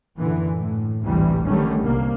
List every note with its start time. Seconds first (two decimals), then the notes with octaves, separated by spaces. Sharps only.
0.17 F#2 A#2 D3 E3
0.56 A2
1.02 A1 D2 G#2 C3 E3 G3
1.46 D3 D#3 G3 A3 C#4
1.82 C2 A#3